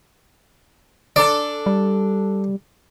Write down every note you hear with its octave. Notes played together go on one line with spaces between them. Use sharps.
D4 A4 D5
G3